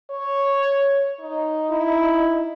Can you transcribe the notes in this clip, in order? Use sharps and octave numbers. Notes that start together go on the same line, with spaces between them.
C#5
D#4
E4